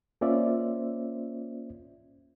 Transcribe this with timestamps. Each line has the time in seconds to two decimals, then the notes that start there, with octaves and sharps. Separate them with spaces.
0.21 A#3 C#4 F4 C5 D5 E5